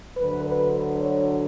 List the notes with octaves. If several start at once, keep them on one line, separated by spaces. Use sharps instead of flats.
D2 D3 F#3 B4
B4
C#5